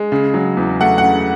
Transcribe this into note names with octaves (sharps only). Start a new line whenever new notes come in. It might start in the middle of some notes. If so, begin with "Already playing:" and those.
Already playing: G#3
C#3
F#3
E2
A3 F#5
F#5
C#3